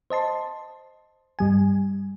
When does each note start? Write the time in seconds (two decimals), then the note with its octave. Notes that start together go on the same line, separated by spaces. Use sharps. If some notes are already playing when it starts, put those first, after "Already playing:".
0.10 C5 D#5 A5 C6
1.39 G2 G3 G#5